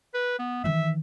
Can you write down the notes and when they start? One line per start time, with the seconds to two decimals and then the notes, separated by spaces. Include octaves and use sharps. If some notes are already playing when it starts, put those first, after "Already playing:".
0.14 B4
0.39 B3
0.64 D#3 E3 E5